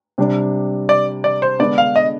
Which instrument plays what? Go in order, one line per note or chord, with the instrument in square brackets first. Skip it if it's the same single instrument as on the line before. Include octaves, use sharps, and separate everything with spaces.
[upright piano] C3 G3 D4
[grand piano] D5
D5
C5
[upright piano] D3 G#3 B3 D4 [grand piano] D5
[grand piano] F5
D#5